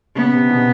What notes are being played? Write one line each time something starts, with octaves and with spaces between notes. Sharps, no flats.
C#3 B3
C3
B2